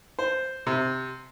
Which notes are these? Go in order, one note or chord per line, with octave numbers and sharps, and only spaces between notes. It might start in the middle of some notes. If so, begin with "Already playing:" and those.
C5
C3